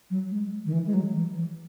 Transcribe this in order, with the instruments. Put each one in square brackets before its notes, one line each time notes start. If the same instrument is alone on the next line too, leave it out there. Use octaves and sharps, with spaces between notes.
[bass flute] F#3
G#3
D#3
E3
G#3
F#3
E3
E3